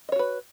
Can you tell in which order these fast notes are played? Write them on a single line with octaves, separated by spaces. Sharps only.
D#5 C#5 F#4 B4